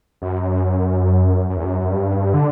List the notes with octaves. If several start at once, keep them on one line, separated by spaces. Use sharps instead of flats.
F#2
F#2
E2
F#2
G2
D3